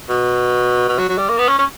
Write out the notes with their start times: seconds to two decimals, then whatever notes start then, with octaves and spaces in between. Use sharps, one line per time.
0.09 B2
0.88 B2
0.98 F#3
1.09 F#3
1.18 G3
1.29 A#3
1.38 B3
1.49 C#4
1.59 C#4